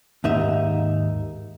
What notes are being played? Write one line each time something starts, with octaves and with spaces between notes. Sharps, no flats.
D#2 G#2 D#4 E5